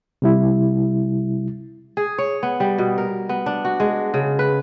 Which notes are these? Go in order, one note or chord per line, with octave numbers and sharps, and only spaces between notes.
C3 G3 E4
G#4
C#5
B3
G3
B2
A#4
B3
D4
F#4
G#3
C#3
B4